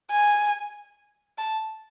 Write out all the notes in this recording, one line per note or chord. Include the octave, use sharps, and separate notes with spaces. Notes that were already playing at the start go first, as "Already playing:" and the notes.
G#5
A5